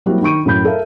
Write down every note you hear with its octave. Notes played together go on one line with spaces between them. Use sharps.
F#3 G3 A#3 C4 E4 F#4
D#3 B5 C#6 D7 D#7
F#2 A2 A#4 B5 G6
A4 A#4 E5 F5